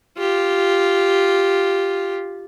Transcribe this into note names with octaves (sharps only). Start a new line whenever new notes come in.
F4 G4